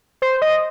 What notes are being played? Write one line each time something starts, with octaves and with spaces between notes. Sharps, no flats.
C5
D#5